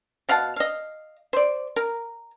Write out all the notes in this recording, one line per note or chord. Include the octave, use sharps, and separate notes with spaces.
B2 F5 F#5 A5
D#5 F5
C5 D5
A#4